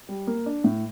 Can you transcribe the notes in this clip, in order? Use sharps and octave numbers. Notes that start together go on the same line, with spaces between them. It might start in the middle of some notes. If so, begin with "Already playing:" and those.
G3
A#3
D4
A2